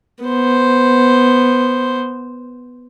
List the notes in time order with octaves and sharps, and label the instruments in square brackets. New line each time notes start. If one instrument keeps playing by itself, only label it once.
[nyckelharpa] B3 C5